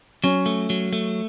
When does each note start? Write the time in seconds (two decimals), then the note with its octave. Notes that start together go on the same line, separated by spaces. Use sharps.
0.24 F#3 C#4
0.46 A3
0.70 F#3
0.93 A3